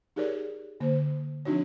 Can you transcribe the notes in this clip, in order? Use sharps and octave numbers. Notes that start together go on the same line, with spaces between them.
D#4 G4 G#4 A#4 C#5 D5
D3 A#3 C5
F3 C4 D4 D#4 F#4 C#5